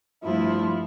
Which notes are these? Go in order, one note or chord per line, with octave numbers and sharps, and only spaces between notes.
G2 F3 A3 E4